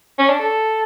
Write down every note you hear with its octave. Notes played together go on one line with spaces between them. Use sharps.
C#4
D4
A4